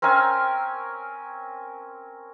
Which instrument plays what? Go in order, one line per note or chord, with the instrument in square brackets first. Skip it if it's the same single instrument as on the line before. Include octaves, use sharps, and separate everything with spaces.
[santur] C4 C#4 A#4 G#5